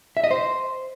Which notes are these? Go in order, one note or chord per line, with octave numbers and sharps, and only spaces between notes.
E5
D#5
C5